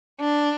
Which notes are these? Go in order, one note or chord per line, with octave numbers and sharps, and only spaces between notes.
D4